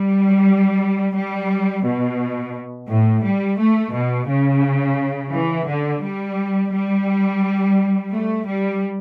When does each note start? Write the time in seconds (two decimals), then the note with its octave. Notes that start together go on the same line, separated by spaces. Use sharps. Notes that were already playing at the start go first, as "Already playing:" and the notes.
Already playing: G3
1.14 G3
1.83 B2
2.89 A2
3.24 G3
3.58 A3
3.93 B2
4.28 C#3
5.33 E3
5.68 D3
6.03 G3
6.72 G3
8.12 A3
8.46 G3